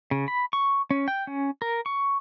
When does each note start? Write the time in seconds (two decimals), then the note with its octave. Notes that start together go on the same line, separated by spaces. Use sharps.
0.11 C#3
0.28 B5
0.53 C#6
0.91 C#4
1.08 G5
1.27 C#4
1.62 A#4
1.86 C#6